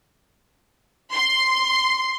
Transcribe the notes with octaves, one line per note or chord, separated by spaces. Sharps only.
C6